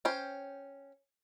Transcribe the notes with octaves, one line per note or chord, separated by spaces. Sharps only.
C#4 C5 G5